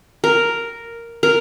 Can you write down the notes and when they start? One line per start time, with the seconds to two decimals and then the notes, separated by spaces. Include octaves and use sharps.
0.24 A#4
1.23 A#4